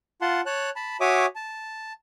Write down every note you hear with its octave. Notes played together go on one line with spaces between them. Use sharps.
F4 F#5 A5 C6
C#5 A5 F#6
A5 B5
F#4 C#5 E5 G#5 D6 D#6
A5